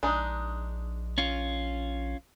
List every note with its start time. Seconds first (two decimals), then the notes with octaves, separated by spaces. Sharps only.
0.03 A#1 G#3 D4 D#4
1.18 C#4 F4